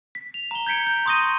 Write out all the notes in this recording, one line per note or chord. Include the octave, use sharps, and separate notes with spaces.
B6
F7
A#5 G7
G6 G#6 B6 C#7 D7
G6
C6 C#6 D#6 G6 A#6 D#7